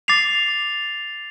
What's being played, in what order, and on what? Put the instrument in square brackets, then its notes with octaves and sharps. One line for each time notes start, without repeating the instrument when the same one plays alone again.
[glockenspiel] D6 A6 C7 F7